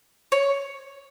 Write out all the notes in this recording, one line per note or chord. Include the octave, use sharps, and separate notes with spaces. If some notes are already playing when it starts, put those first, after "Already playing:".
C#5